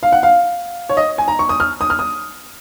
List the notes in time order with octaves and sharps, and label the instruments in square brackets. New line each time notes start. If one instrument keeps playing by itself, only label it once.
[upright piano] F5
F#5
F5
C#5
D#5
G#5
A#5
C#6
D#6
F6
D#6
F6
D#6